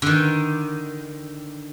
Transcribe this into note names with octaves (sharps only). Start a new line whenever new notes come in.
D3 D#3